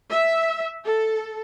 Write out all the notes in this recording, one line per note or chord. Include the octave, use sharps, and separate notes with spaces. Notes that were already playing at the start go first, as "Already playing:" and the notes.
E5
A4